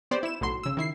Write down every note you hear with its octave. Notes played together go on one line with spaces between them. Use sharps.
B3 G4 C5 D5
E4 E7
B1 A2 F#3 C6
C#3 E6
D#3 E4 C7